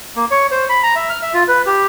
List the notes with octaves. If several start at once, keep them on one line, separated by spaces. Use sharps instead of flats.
A#3
C#5
C5
B5
A#5
E5
F6
E5
F4
B4
G4